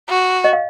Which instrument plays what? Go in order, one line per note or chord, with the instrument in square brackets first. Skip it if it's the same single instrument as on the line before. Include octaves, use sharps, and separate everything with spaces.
[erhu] F#4
[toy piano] D#5
F5